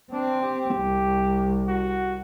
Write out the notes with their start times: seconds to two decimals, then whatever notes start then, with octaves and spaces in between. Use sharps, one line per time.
0.12 C4 D4
0.42 G4
0.77 C2
1.68 F#4